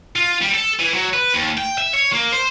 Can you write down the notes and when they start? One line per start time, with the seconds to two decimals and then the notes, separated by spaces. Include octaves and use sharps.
0.16 F4
0.42 G3
0.53 A4
0.80 E3
0.94 F#3
1.13 B4
1.34 D#2
1.58 G5
1.78 E5
1.93 C#5
2.12 A#3
2.32 C5